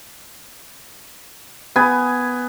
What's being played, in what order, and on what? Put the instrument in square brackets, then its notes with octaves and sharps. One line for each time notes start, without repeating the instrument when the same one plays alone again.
[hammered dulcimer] B3 G#5